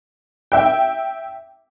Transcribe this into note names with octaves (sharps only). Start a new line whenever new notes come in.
E5 G5